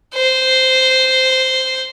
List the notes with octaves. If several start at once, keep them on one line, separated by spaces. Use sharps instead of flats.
C5